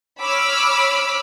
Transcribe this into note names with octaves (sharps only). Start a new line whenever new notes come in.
C#5 B5 D6 E6 F6